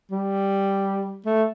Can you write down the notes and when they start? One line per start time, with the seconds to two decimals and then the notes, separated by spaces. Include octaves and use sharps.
0.11 G3
1.26 A3